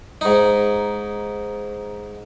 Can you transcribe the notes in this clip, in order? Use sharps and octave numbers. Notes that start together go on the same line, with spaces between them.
G#2 D#4